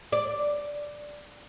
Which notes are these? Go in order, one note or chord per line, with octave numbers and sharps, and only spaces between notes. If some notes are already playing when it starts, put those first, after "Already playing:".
D5